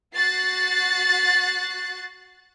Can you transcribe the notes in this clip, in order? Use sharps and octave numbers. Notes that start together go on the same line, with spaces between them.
F#4 F#6 A6 C7